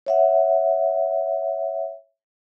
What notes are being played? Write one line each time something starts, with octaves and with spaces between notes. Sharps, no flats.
C#5 E5 F#5